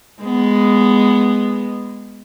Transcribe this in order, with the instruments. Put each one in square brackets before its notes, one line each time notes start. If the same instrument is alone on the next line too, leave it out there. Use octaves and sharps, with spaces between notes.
[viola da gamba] G#3 B3